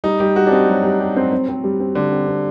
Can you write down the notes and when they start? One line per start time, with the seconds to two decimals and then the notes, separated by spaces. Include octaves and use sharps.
0.04 G3 D#4
0.20 G3 G4
0.36 G3 F#4
0.47 D4
0.51 C4 D#4
0.68 F#3 G3
0.84 G3
1.00 G4
1.16 C4
1.32 C4
1.49 C4
1.64 G3
1.80 C4
1.95 D3 G3
2.12 C4
2.28 C4